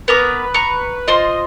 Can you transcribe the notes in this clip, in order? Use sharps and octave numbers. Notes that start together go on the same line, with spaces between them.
B3 A#4 B4 D6
A#5 C#6
F4 C5 D#5 C6